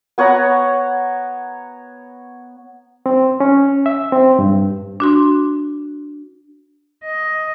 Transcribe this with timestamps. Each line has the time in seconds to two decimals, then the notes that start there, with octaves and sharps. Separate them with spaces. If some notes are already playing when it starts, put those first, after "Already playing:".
0.18 B3 C#5 F#5 A#5
3.06 C4
3.40 C#4
3.86 E5
4.12 C4
4.39 G2
5.00 D4 F#4 C6
7.04 D#5